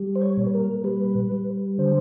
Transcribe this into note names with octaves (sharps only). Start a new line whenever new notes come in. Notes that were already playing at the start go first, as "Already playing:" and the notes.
Already playing: G3
C5
C#5
A#2
B4
A#4
G3 B4
G3
D3 C5